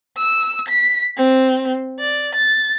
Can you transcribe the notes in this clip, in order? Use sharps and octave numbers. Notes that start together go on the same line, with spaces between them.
E6
B6
C4
D5
A6